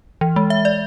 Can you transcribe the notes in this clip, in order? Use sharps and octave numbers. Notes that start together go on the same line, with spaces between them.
E3
G#3
E5
D5